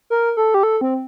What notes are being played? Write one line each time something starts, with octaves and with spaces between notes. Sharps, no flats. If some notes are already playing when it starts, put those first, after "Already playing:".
A#4
A4
G4
A4
C4